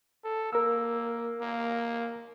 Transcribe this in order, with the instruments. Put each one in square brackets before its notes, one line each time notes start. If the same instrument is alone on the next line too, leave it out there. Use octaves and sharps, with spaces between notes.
[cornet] A4
[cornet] A#3 [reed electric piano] A#4 E6
[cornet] A#3